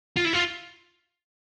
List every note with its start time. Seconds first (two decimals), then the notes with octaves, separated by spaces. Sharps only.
0.16 F4
0.25 E4
0.33 F4